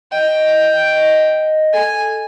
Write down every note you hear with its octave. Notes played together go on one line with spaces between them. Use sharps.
D#5 G5
D#5
A4 G#5